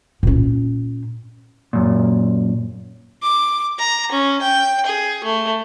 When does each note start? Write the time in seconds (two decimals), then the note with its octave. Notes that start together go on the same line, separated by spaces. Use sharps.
0.23 A#2 C#4
1.73 F#2 A#2
3.23 D6
3.79 A#5
4.12 C#4
4.42 G5
4.86 G#4
5.24 A3